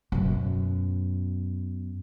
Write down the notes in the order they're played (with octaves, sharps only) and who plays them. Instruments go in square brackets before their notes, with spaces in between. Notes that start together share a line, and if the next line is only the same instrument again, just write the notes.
[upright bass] F#2 B2